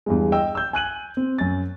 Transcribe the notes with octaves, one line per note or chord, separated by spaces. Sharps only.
E2 G2 G#3
D#5 G5 E6
E6 G6
G#5 F#6 D#7 F#7
C4
F#2 A6